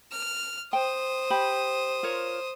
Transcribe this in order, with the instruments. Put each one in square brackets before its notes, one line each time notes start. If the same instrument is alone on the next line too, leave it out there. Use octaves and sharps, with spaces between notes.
[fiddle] F6
[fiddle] C5 D#6 [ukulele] G5
[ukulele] G4 B5
F4 A#4 C#5